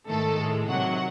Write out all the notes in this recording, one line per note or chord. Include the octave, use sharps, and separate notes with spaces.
G#2 D#3 A3 A4
A2 G#3
C3 D#3 F#3 F#5